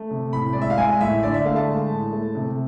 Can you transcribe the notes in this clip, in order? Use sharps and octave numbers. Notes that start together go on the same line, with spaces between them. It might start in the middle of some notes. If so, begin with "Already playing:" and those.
Already playing: A3
C3
A2 B5
G#3 D5
E5
F5
G#3 G#5
A2 E5
D3 D5
E5
A3 F5
A5
G#3
A2
A3
C3